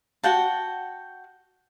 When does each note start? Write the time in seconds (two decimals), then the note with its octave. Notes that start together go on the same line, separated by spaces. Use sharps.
0.23 F#4 F#5 G5 A5